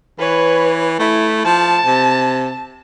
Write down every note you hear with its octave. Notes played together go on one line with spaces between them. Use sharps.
E3 B4 C#5
A3 E4
F3 A5
C3